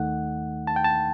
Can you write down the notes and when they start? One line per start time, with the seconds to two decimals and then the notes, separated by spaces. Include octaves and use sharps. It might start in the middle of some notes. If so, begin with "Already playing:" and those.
Already playing: D#2 D#3 A3 D#4 F#5
0.67 A5
0.76 G5
0.84 A5